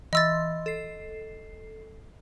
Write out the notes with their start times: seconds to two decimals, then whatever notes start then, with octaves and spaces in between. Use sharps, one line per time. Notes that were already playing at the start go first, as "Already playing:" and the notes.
0.13 E3 D#5 C6 E6 A6
0.66 A4 C7